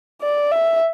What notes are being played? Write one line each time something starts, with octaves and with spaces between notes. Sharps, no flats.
D5
E5